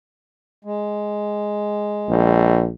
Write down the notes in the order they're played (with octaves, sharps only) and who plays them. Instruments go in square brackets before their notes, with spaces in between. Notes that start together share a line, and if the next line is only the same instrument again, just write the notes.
[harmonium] G#3
[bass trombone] A#1